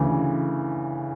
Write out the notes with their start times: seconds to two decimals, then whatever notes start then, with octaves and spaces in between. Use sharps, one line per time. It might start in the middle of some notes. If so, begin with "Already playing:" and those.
Already playing: D2 C#3 E3